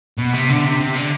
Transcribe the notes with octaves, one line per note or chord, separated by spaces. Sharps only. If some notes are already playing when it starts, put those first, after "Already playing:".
B2
C3
D3
C3
C3
D3